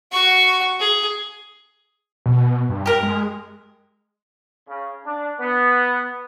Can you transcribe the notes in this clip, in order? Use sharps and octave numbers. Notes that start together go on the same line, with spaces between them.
F#4 C#6
G#4
B2
G2
G4 A#4
G#3
C#3
D4
B3